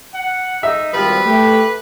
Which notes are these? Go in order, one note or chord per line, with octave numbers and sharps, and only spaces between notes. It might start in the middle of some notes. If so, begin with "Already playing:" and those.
F#5
D#4 E5
G#1 F3 G3 F#4 B4
A3 G4